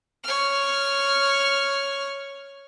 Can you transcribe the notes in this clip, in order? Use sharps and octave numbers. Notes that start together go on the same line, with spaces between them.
C#5 F6